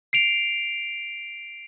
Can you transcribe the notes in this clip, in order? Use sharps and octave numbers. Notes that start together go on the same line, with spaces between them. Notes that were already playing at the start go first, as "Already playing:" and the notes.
C7 D7 F7